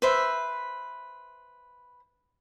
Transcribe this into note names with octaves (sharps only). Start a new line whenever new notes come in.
B4 C5 E5